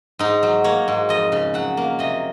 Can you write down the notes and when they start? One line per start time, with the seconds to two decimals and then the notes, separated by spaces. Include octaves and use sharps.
0.19 G#2 D#4
0.43 F#3
0.64 A#3 C#5
0.88 G#2
1.09 F2 D#5
1.32 C#3
1.54 F#3 F#5
1.77 A#3
1.99 C3 D#5